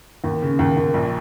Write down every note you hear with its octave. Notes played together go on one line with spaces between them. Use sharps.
D#2
C#3
D#2
D#2
A#1